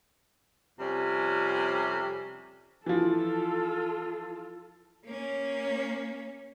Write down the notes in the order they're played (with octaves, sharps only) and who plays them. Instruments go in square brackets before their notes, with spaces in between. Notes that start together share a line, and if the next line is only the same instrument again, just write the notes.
[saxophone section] F2 C3 G3 C#4
[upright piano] E3 F3 [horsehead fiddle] F4 A4
[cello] A#3 C#4